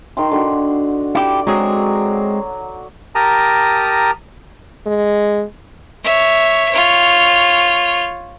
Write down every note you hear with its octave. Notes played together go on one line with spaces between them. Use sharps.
D#3 G5 C6
D3 F#4
E4 G4 D5
F#3 G#3 C4 G#4
G4 A#4 A5 A#5 D#6
G#3
C#5 E5
F4 C#5